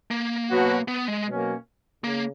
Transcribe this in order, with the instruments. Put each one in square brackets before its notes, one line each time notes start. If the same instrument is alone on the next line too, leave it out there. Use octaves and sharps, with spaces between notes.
[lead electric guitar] A#3
[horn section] B2 F#3 B3 F#4
[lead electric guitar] B3
G#3
[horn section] B2 F#3 A#3 C#4
[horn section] C#3 [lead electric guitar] A#3